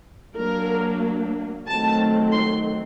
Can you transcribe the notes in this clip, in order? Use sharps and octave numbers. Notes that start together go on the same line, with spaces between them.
F#3 A#3 D4 A#4
D#3 F#3 A3 C4 A5
C6